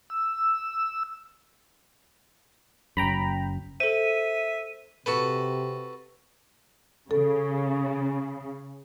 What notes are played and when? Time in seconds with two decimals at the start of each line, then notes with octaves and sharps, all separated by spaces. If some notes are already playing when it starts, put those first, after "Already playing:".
0.10 E6
2.97 F#1 F#2 G5 A#5 B5
3.80 A4 C5 E5 D#7
5.06 C3 F#4 A4 B4
7.11 C#3 A4